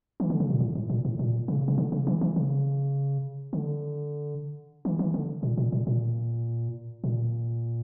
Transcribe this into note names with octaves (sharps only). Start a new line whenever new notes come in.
E3
D3
C#3
A#2
A2
A2
A#2
A2
A#2
C#3
C#3
D3
C#3
E3
E3
C#3
D3
E3
E3
D3
A#2
A#2
A#2
A#2
A#2